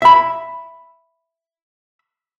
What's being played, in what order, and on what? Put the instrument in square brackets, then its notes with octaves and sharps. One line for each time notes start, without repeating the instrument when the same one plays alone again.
[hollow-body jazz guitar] E5 B5